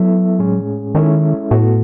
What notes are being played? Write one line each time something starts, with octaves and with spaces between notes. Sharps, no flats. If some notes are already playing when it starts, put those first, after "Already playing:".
Already playing: F#3 B3 E4 A4 E5
A2 G#3 C#4 G#4
D#3 G#3 C#4 E4 A4 E5
A2 B3 F#4 A4